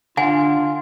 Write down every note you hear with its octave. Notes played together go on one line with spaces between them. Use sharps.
D3 D4 F4 F#5 G#5